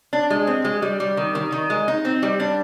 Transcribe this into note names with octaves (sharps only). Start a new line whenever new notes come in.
D4
G#3
C4
G#3
G3
G3
D#3
D#3
D#3
G#3
D#4
C4
G3
D4